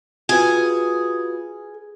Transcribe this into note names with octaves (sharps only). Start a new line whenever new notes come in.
F4 F#4 G#4 B4